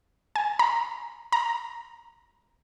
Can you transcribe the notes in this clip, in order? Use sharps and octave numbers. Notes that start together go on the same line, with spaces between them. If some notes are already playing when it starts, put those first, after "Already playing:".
G#5
A#5
A#5